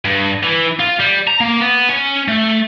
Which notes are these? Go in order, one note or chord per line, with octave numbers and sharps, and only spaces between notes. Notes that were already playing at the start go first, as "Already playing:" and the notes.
G2
E3
F4
G3
A#5
A#3
B3
C#4
A3